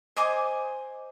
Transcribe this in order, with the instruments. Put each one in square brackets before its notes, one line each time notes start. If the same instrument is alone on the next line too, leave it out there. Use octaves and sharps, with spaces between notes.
[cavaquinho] C5 D#5 G#5 D6